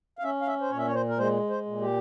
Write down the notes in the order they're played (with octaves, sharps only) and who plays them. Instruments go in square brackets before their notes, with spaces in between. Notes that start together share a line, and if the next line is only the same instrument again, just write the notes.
[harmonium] F5
C#4 E5
F5
E5
C5
A#2 C#5
E5
C#5
C5
A#4
G#3 C5
C5
A#2
G4